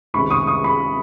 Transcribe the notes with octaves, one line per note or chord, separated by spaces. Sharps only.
C#2 C3 D#3 B5 C#6
C#6 D#6
C#6 D#6
B5 C#6